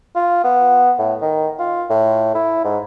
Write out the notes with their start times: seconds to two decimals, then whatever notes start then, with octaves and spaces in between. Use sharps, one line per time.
0.15 F4
0.44 B3
0.98 A2
1.21 D#3
1.59 F4
1.90 A2
2.35 E4
2.64 G#2